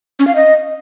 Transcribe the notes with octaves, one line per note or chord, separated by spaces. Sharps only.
C#4
F5
D#5